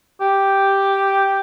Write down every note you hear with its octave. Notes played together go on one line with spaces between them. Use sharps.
G4